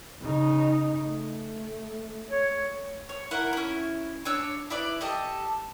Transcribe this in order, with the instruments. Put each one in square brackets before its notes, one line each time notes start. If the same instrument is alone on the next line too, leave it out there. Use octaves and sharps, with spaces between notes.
[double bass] C#3 D#4
A3
[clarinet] C#5
[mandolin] C#5
E4 A#4 F#5
C#4 E4
D4 C#5 E6
E4 B4 D5
G4 A4 D#5